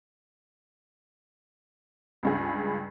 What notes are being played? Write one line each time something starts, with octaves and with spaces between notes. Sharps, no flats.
C#2 G2 G#4